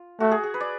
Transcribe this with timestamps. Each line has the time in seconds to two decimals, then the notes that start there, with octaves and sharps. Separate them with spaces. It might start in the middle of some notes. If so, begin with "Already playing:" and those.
Already playing: F4
0.20 A3 F#4
0.31 G#4
0.44 G#4
0.54 B4
0.61 D5